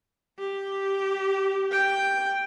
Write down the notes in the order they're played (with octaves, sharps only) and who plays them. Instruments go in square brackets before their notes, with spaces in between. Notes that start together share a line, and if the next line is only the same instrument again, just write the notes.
[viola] G4
[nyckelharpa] G5